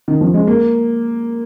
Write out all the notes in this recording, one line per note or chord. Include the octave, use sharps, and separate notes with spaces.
D#3
F3
G#3
A#3